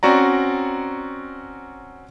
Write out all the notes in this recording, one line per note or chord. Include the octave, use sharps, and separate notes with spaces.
C4 C#4 F#4 D5 A#5